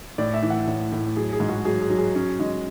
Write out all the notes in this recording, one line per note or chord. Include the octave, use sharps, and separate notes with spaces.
A2 D5
E5
E3
F#5
A2
A2
F#3 G#4
G#4
G#2
F#4
F#3 G#4
G#4
F#3
G#4
C#4
G#3